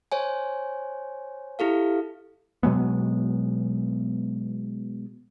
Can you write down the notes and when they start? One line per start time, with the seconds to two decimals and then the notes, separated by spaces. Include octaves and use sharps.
0.12 C5 C#5 G#5
1.59 E4 G4 A4 F5
2.63 B2 F#3 G#3 B3